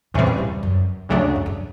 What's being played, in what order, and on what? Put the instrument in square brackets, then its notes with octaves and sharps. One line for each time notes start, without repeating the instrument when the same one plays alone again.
[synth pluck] E2 C#3 E3 G3 C4 [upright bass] A#2
[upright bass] A2
G#2
F#2
[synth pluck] D2 C#3 F#3 A3 D4 [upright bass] G2
[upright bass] F#2
G2